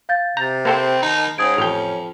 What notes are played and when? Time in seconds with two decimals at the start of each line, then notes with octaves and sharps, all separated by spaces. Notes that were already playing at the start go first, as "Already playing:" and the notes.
0.09 F5 G6 A6
0.37 C3 A#5 G6 A6
0.65 A#3 C4 A4 C5
1.02 D#3 D#4
1.38 G#2 C#4 D#6 G#6 D7
1.58 A1 F2 G5 F7